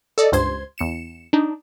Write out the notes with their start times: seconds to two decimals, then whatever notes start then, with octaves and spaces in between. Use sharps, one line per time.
0.18 A4 D5 D#5
0.32 C#2 G2 C5 C6 G#6
0.78 E2 C#7 E7
1.33 D4 D#4